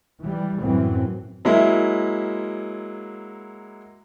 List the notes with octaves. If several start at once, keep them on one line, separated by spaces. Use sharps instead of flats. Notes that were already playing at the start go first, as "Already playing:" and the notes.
E3 G3
F#2 A2 E3 C4
F#3 G#3 A#3 E4